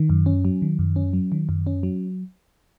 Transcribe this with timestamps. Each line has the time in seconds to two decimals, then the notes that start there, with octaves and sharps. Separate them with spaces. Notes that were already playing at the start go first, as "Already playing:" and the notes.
Already playing: D#3
0.10 F#2
0.26 C#4
0.45 F#3
0.62 D#3
0.79 F#2
0.96 C#4
1.13 F#3
1.32 D#3
1.49 F#2
1.67 C#4
1.83 F#3